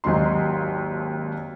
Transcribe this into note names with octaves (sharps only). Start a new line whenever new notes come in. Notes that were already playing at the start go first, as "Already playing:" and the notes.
G#1 D#2 F#3 D#4 C6